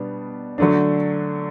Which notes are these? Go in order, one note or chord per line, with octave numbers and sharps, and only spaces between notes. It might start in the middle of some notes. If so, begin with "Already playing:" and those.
Already playing: B2 G3 B3 D4
D3 F#3 A3 D4